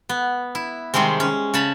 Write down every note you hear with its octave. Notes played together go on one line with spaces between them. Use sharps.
B3
E4
C3 D#3 G3 G#3 C4
C#4
C#3 C#5 A5 B5